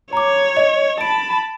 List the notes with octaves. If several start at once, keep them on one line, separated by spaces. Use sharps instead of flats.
C#5 A#5 D6
D#5
A5 B5 D7